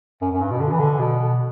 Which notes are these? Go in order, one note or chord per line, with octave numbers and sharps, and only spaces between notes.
F#2
F#2
G2
B2
D3
E3
D3
B2